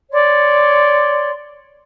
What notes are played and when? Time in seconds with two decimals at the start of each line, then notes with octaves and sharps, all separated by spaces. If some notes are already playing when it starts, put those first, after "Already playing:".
0.10 C#5 D5 C6